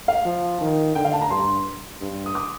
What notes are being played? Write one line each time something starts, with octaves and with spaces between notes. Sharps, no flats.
F5
F3
D#3
D3 G5
F5
A5
A#5
G2 C6
G2
D#6
D6